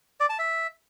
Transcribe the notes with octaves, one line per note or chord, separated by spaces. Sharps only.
D5
A5
E5